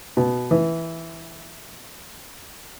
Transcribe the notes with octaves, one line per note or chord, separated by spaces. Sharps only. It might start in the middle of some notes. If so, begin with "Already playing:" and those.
B2
E3